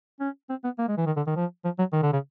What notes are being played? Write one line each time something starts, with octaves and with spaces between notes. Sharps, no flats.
C#4
C4
B3
A#3
G#3
E3
D#3
D3
D#3
F3
F3
F#3
D#3
D3
C#3